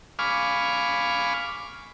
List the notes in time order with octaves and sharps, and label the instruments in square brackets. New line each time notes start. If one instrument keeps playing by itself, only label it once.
[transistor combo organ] F5 G#5 B5 C#6 D6 F6